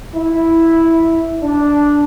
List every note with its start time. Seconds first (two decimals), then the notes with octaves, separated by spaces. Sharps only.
0.15 E4
1.43 D4